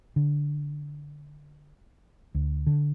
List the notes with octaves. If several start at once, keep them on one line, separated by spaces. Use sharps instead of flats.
D3
D2
D3